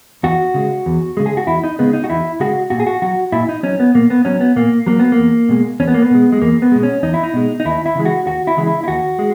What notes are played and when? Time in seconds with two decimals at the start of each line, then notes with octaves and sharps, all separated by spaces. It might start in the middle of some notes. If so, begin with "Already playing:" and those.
0.23 E2 F#4
0.54 C#3 G#3
0.86 E2
1.17 C#3 G#3
1.26 G#4
1.37 F#4
1.47 E2 E4
1.63 D#4
1.79 C#3 G#3 B3
1.93 D#4
2.04 F#4
2.10 E2 E4
2.40 C#3 G#3 F#4
2.70 A#2 F#4
2.80 G#4
2.87 F#4
3.02 F#3 F#4
3.32 A#2 E4
3.49 D#4
3.63 F#3 C#4
3.80 B3
3.95 A#2 A#3
4.10 B3
4.25 F#3 C#4
4.40 B3
4.56 A#2 A#3
4.86 F#3 A#3
4.99 B3
5.12 A#3
5.18 E2
5.49 B2 G#3
5.80 E2 C#4
5.88 B3
5.94 A#3
6.02 B3
6.10 B2 G#3
6.32 G#3
6.41 E2 A#3
6.62 B3
6.72 B2 G#3
6.83 C#4
7.03 E2 D#4
7.14 E4
7.23 D#4
7.34 B2 G#3
7.60 D#4
7.65 D#2 E4
7.86 E4
7.95 C#3 E3 G#3
8.05 F#4
8.27 D#2 F#4
8.47 E4
8.57 C#3 E3 G#3
8.67 E4
8.84 E4
8.88 D#2 F#4
9.19 G#3